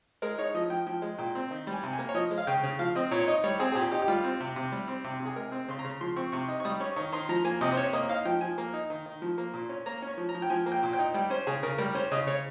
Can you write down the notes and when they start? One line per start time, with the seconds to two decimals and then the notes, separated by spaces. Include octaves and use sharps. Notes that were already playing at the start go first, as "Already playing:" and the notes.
0.22 G#3 A#4
0.38 D#4 C#5
0.55 F3 D#5
0.70 F3 G5
0.87 F3 G5
1.02 G#3
1.18 A#2 G5
1.35 C4
1.51 D#3
1.67 G3
1.73 G#5
1.83 C3
1.93 G#5
1.99 A#3
2.09 C#5
2.15 F3 D#5
2.31 G#3
2.38 F5
2.47 C#3 G5
2.63 C#3
2.79 F3 F5
2.95 C4 D#5
3.11 A#2 C#5
3.21 C#5
3.27 D#4 D#5
3.44 G3 C#5
3.60 C4 G#4
3.72 G#4
3.75 A#2 G4
3.92 D#4 G4
4.02 G4
4.08 G3 F4
4.24 C4
4.40 C3
4.56 C3
4.72 G3
4.88 C4
5.04 C3
5.20 C3
5.25 G#4
5.36 G#3 A#4
5.52 C4
5.68 C#3 C6
5.79 A#5
5.85 C#3
6.01 F3 C6
6.16 C4 C#6
6.32 C3 C#6
6.48 D#4
6.60 C#6
6.65 G3 D#6
6.80 C#4 C#6
6.96 D#3 C#6
7.12 D#3 C6
7.29 F3 A#5
7.44 A#3 G#5
7.61 C3 D#5
7.72 C5
7.77 C#4 C#5
7.93 A#3 D#5
8.09 D#4 F5
8.25 F3 G5
8.41 F3 G#5
8.58 A#3
8.74 D#4
8.90 D#3
9.06 D#3
9.22 F3
9.38 A#3
9.54 A#2
9.69 C#4
9.86 A#3 A#5
10.02 C#4
10.07 C#6
10.18 F3
10.29 A#5
10.35 F3
10.42 G5
10.50 F3 G#5
10.66 A#3
10.72 G5
10.83 A#2
10.93 G5
10.99 D#4
11.14 G3 G5
11.30 C#4 C5
11.47 C#3 G#4
11.63 C#3 A#4
11.78 G3 A#4
11.95 C#4 C5
12.11 C#3 D#5
12.27 C#3 C#5